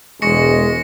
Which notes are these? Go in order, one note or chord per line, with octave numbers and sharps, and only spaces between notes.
E1 G#3 C#6 A#6 C#7